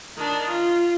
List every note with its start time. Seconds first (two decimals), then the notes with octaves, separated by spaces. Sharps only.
0.17 D#3 D4
0.48 F4